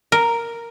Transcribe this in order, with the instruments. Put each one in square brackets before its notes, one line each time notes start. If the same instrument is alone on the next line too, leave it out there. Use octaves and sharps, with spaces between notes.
[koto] A#4